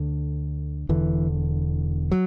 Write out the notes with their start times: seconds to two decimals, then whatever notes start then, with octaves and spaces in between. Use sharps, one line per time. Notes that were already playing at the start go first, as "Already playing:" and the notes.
Already playing: D2 D3
0.89 E1 E2 D3 E3
2.11 F#3